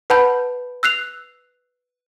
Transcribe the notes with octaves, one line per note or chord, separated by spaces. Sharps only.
B4 F#5 A5 B5 G6
E6 F#6 C7 F7